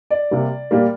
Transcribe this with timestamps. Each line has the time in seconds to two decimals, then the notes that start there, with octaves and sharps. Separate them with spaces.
0.10 D5
0.31 C3 G3 A#3
0.71 A#2 G3 A#3